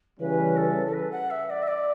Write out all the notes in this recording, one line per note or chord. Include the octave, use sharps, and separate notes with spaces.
C#3 E3 G3 C#4 B4
A4
A4
B4
F#5
E5
D5
E5
D5